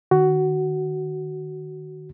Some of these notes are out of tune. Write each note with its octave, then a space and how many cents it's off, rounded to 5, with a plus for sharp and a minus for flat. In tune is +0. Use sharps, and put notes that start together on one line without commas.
D#3 -30 F#4 +15